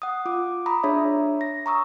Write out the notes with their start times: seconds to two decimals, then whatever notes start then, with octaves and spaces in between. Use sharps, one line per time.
0.02 F#5 D#6
0.25 F4 D6
0.66 A#5 B5 D#6
0.83 D4 G#4 C#5 E5
1.41 A#6
1.66 A#5 C#6 D#6 E6